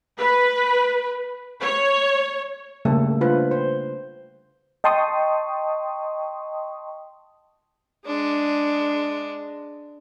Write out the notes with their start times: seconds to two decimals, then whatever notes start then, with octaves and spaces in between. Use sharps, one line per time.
0.18 B4
1.61 C#5
2.85 C#3 G3 A3 A#3 A4
3.21 D4 F4 B4 C5
3.51 C5
4.84 D#5 G5 A5 C6 C#6 D#6
8.06 G#3 D4